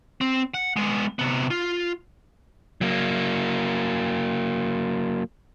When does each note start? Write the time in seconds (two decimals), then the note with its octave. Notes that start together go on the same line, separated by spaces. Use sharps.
0.21 C4
0.54 F#5
0.76 G#3 B3
1.19 C3 B3
1.50 F4
2.81 F#3 A#3